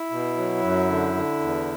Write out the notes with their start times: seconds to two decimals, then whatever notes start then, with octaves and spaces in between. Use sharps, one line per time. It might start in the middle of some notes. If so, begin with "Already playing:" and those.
Already playing: E4
0.10 B2
0.37 F#3
0.62 F#2
0.88 D3
1.14 D3
1.40 E2